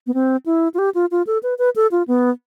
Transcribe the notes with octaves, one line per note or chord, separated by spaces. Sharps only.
B3
C4
E4
F4
G4
F4
F4
A4
B4
B4
A4
F4
B3